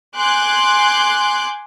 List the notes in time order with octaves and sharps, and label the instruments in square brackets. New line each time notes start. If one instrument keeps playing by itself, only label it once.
[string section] G#5 C6 D6 F#6 G6